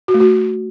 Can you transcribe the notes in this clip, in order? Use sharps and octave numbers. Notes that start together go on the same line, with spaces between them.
F#4
A3
F#4